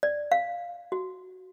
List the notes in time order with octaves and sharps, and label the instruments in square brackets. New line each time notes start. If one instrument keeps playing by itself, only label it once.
[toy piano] D5
F5
F#4